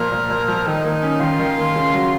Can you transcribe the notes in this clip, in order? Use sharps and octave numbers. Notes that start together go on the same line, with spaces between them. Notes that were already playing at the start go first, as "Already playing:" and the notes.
Already playing: A#2 F3 A#3 A#4
A#2
A#2
F3
D#3 D#4
A#3
C#4
D#3 F4
D#3
A#3
C#3
F#3